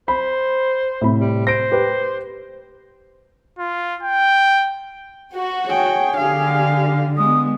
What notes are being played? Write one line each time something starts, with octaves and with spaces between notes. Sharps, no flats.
C5 B5
A2 C3 B5
G3
C5 A#6 D7
G4 B4
F4
G5
F#4
G#4 C#5 G5
D3 G4 F5
G#3 B3 D#6